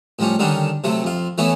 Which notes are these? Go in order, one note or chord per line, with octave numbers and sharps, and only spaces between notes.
A2 F3 G3 C#4
D3 D#3 G3 C#4 D4
C3 F#3 A3
F2 F4
E3 A3 B3 C#4 E4